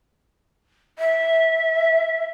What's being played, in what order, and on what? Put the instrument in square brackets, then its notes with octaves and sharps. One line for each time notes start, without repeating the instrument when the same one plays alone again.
[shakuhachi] E5